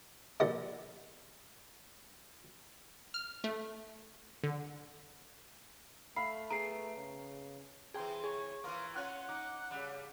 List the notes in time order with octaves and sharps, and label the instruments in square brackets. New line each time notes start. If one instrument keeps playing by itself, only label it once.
[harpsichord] A#1 G2 D#3 G3 D#5 F#5
[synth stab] F6
A3
D3
[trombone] A3 [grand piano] E5 F5 B5 [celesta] C7
[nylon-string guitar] B3 G#4 [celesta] A#5 C7 [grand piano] D7
[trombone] C#3
[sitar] C3 E3 [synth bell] G#4 G5 C6
[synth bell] G#4 [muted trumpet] C#5
[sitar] E3 A#3 [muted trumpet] F4
[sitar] C#4 F4 [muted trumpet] F#5 [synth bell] F#6
[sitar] D#4 [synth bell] D6
[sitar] C#3 G3